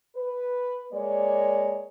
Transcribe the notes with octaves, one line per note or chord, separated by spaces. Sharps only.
B4
G#3 A#3 C#5 D5